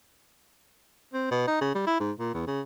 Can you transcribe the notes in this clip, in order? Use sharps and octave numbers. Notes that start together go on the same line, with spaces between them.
C4
B2
D#4
C#3
G3
E4
G#2
A#2
E2
C#3